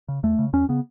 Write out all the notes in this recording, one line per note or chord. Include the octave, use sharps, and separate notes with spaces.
C#3
E2 A3
C#3
E2 C#4
C#3 B3